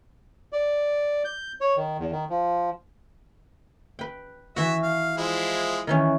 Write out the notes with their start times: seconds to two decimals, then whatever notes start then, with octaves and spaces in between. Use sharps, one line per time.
0.53 D5
1.25 G6
1.61 C#5
1.77 D#3
1.99 E2
2.11 D#3
2.30 F3
3.99 B4 G5
4.56 E3 F#4 E5
4.83 F5
5.17 F3 G#3 E4
5.87 D#3 E3 C#4